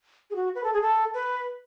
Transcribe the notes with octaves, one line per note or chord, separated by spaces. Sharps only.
G#4
F#4
B4
A4
G#4
A4
B4